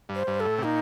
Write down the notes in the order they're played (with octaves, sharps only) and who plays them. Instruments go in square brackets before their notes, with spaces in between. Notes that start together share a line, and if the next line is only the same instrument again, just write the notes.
[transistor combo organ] G2
[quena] C5
[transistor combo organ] G2
[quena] A4
[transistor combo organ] A2
C3
[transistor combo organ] A#2 [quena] D#4